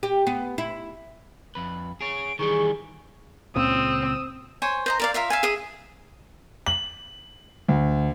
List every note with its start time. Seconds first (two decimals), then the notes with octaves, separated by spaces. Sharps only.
0.03 G4
0.27 B3
0.58 E4
1.55 F2 B4
2.01 G#4 C#5 D7
2.39 D#3 E3 G3 G#4 C#6
3.56 C#2 A#2 C#3 C4 D#6 E6
4.62 C5 C#5 G#5
4.86 C5 D#5 A#5
5.00 A#4 D5 F5
5.14 F4 A#4 E5 F5
5.30 E5 F5 G#5
5.43 G#4 E5 D#6
6.66 F#7
7.69 D2